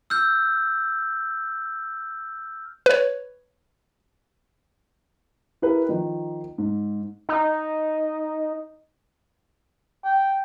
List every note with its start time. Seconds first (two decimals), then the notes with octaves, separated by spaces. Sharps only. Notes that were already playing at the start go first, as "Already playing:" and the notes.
0.10 E6 F6 G6
2.86 B4 C#5
5.62 E4 G4 G#4 A#4 B4
5.89 D#3 F3 D#4
6.58 G#2
7.29 D#4
10.04 G5